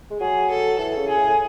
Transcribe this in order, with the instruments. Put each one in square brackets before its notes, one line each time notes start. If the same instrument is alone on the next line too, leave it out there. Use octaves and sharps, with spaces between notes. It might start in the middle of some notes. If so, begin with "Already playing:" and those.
[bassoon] G#3
[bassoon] F#3 [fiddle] G#4
[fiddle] A4
[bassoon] E3 [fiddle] A4
[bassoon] C#3
[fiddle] G#4
[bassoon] A2